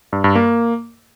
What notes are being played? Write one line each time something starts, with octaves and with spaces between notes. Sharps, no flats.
G2
G2
A#3